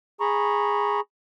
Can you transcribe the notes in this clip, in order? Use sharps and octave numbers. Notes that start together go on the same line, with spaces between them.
G#4 A#5 B5 C#6